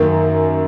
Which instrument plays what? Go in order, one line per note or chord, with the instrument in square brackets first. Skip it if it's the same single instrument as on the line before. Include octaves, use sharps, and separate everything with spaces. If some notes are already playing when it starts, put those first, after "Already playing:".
Already playing: [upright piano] F#2 D#3 A#3